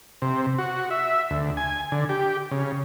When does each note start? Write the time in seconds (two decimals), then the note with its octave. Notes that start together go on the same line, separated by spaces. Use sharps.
0.22 C3
0.58 F#4
0.91 E5
1.30 D2
1.57 G#5
1.92 D3
2.09 G4
2.51 C#3